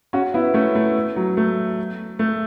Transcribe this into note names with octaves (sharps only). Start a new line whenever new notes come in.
C#4 F#4
B3 E4
A3 C#4
A3
F#3
A3
A3